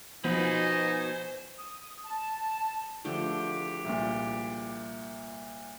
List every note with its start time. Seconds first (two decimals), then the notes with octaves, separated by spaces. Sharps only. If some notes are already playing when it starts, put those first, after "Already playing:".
0.24 B2 F3 B3 D#4 C5 G#5 B5
1.58 D#6
2.05 A5
3.05 E2 D3 F3 A3 D4 G4
3.85 C2 A#2